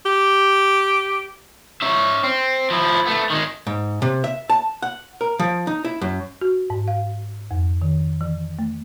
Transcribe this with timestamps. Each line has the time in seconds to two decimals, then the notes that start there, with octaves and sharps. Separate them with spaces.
0.06 G4
1.82 C#4 E5
2.24 C4
2.70 F3 E4
3.06 A3 B3
3.30 D#3 G#3
3.67 G#2
4.02 C3
4.24 E5
4.50 A5
4.82 F#5
5.21 A#4
5.39 F3
5.67 D#4
5.85 E4
6.01 F#2
6.41 F#4
6.70 G#2
6.88 F5
7.51 F2
7.82 D#3
8.21 E3
8.59 A3